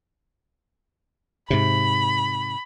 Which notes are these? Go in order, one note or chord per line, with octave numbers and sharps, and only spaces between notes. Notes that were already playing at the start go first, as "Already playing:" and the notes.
G#2 C3 B5